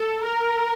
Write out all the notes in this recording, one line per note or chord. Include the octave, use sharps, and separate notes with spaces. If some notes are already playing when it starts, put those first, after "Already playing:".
Already playing: A4
A#4